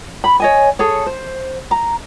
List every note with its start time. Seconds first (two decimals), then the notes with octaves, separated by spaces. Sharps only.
0.24 B5
0.40 C#5 D#5 G#5
0.79 G#4 A4 C#5
1.06 C5
1.71 A#5